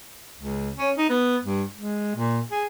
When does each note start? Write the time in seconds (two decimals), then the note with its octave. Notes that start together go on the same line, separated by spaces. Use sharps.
0.36 C#2
0.77 C#4
0.98 D#4
1.09 B3
1.43 G2
1.75 G#3
2.16 A#2
2.51 G#4